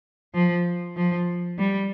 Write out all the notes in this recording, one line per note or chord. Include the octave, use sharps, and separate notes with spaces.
F3
F3
G3